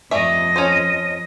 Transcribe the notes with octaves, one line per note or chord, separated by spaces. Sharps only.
F2 G3 A3 D#5 E5
C#4 A4 C5